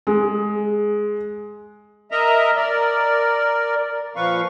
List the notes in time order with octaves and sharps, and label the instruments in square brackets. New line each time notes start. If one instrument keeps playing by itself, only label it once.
[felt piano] G#3
[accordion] A#4 D#5 E5 A#5
A#4 D5
A#2 F3 B4 F5 C#6